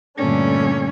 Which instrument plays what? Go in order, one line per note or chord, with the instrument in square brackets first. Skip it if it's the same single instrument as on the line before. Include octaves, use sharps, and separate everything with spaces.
[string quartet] G2 A#2 D3 A3 C#4 D4